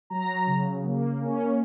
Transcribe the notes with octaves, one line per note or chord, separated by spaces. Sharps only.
F#3 A#5
C#3
A#3
C#4